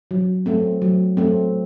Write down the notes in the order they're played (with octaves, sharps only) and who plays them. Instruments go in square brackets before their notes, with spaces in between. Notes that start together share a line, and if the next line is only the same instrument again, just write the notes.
[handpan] F#3
A3 C4
F#3
A3 C4